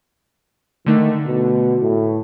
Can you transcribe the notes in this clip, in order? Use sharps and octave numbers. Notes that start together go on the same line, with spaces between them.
D3 D#3 A3
B2
A2